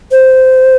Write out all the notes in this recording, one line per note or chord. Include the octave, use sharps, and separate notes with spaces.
C5